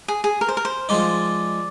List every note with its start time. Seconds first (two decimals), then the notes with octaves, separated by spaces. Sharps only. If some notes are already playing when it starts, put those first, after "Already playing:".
0.08 G#4
0.24 G#4
0.41 A#4
0.49 C5
0.57 A#4
0.65 C5
0.89 F3 G#3 D#4 D5